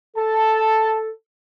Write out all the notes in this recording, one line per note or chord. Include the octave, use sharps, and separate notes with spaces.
A4 A5